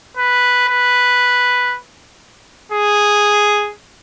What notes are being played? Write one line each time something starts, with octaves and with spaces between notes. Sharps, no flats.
B4
B4
G#4